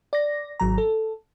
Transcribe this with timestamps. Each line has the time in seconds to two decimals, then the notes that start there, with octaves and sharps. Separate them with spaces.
0.13 D5 A#6
0.60 G#1 F#3 A#5
0.78 A4